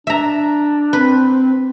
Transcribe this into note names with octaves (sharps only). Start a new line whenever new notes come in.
D4 E5 A#5
C4 B4